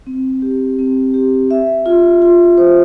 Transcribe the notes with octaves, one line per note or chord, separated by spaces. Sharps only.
C4
G4
C4
G4
E5
F4
F4
C5